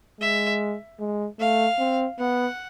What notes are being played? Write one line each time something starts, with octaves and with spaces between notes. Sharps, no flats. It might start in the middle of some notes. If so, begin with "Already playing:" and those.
G#3 E5
G#3
A3 F5
C4
B3 F#5